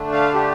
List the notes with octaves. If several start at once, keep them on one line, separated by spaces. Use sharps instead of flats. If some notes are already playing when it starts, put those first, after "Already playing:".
Already playing: D3 A3 D4
F5
G4